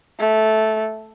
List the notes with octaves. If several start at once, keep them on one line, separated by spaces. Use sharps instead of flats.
A3